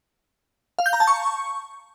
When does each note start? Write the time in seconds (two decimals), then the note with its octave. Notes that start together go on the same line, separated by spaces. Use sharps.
0.79 F5
0.86 G6
0.93 A#5
1.00 A5
1.07 C#6